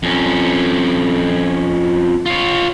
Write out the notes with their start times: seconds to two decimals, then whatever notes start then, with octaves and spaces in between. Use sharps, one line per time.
0.03 F2 C#4
2.26 F4 C#5